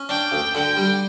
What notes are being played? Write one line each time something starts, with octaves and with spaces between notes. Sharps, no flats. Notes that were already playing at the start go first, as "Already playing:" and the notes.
Already playing: C#4
D4 G5
D2
D3 G5
G3